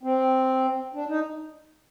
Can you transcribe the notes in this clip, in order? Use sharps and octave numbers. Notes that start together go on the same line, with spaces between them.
C4
D4
D#4